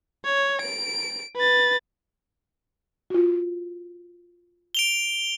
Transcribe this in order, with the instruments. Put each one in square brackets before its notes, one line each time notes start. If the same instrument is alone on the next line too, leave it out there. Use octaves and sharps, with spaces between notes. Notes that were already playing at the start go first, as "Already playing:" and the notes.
[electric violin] C#5
D7
B4 A6
[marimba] F4 F#4
[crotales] D7 F7 G7